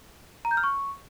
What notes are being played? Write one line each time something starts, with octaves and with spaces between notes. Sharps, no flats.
A#5
G6
F6
C#6